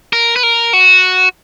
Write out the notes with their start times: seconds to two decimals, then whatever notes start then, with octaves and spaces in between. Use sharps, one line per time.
0.13 A#4
0.36 B4
0.43 A#4
0.73 F#4